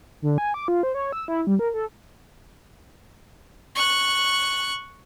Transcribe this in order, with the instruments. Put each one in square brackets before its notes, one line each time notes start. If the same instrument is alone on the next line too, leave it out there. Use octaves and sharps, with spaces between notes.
[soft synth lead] D3
G#5
D6
F4
C5
C#5
E6
E4
G3
A#4
A4
[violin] C#6 F#6